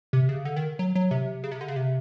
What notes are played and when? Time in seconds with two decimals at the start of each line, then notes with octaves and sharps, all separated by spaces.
0.13 C3
0.29 C#3
0.45 D3
0.56 D#3
0.79 F#3
0.95 F#3
1.11 C3
1.44 C#3
1.52 C3
1.61 D3
1.68 C#3
1.76 C3